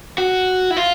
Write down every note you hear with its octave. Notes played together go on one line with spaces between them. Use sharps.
F#4
E4
F4